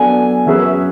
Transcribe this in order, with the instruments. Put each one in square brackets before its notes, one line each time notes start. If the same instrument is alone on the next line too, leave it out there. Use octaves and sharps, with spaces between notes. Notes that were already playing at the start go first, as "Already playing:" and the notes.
Already playing: [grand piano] F#3 B3 D4 A4 [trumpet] G#5
[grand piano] F#3 C#4 G#4 B4 [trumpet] E5